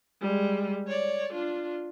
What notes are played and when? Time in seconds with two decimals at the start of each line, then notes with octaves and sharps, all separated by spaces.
0.21 G3 G#3
0.88 C#5 D5
1.33 D4 F4